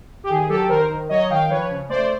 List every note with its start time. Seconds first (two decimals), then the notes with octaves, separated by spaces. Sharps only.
0.24 G4
0.30 D#3 G#4
0.49 F#3 G4 A4
0.69 D#3 A#4 C5
0.89 D#3
1.09 F#3 C#5 D#5
1.30 D#3 F5 G5
1.50 F3 B4 C#5
1.70 C#3
1.89 A3 C5 D5